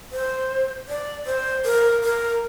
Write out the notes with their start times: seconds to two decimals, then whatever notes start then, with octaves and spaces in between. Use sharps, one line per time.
0.12 C5
0.89 D5
1.26 C5
1.65 A#4
2.04 A#4